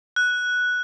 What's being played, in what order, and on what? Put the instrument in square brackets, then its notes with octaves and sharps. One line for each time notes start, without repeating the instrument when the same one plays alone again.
[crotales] F#6